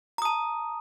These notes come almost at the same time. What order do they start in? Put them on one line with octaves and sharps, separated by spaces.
A#5 D#6 A5